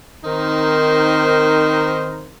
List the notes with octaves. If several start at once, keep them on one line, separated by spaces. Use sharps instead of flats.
D#3 C4 D#4 A#4 C5